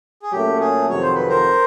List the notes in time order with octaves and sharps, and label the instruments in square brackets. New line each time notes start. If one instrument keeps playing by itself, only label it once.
[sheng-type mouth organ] G#4
[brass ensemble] A#2 F#3 A3 C#4 [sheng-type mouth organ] G4
[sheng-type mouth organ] G#4
[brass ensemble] F2 C3 D#3 F#3 [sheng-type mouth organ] C#5
[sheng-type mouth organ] C5
B4
A#4 C5